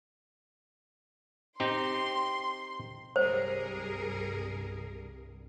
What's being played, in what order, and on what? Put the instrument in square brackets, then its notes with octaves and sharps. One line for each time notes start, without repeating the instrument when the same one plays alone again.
[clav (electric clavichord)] C4 D#4 G4 [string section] C6
[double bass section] C2 G2 [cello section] G3 G#4 A#4 [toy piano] C5